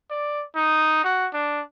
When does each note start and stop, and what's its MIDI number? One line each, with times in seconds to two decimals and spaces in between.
0.11 0.44 74
0.56 1.03 63
1.04 1.27 66
1.33 1.61 62